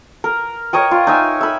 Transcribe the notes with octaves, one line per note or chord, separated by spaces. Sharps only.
A#4
A#4 C#5 D#5 G5
F4
D#4 E5 G#5
E5 B5